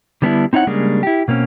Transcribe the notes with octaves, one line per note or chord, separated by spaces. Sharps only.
D3 G3 B3 C#4 D4 E4
C4 D#4 E4 C#5 F#5
C#3 G3 G#3 A#3 D4
E4 G4
B2 A#3 C4 C#4